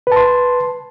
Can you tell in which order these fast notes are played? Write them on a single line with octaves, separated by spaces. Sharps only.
B4 A5 C6